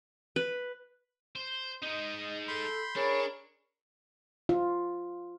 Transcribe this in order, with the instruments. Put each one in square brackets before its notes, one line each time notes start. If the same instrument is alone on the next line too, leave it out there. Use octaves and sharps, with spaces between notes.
[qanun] B4
[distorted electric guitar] C5
[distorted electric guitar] G#3 D#4 [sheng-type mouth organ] D#5
[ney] A4 [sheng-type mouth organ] B5 C6 G6
[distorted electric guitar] D4 [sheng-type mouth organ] G#4 A#4 C#6 [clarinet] C#5 [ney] B5
[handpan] F4